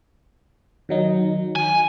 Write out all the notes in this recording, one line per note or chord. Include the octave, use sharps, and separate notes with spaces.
D#3 F#3 D#4
G#5